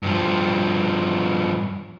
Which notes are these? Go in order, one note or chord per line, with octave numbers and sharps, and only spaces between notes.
G2 F3